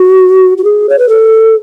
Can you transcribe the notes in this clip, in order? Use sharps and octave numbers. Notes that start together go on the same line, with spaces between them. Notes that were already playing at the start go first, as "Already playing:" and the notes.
Already playing: F#4
F#4
G#4
C#5
B4
A4